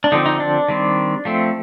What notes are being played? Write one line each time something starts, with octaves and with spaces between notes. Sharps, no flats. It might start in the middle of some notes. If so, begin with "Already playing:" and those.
D4
D3 F3 C4 D#4
D#4
D4
D#3 G3 C4
F3 A3 C4